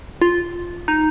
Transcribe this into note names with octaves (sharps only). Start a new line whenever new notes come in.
F4
D#4